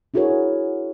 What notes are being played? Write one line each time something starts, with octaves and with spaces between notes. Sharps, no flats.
D4 E4 F#4 G#4 A#4 C#5